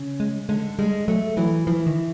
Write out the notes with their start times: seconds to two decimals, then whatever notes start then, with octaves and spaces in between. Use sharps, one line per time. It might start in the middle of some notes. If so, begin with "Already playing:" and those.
Already playing: C#3
0.20 G#3
0.49 D3 G#3
0.79 G3 G#3
1.08 F#3 A3
1.37 E3 F#3
1.67 E3 F3
1.87 D#3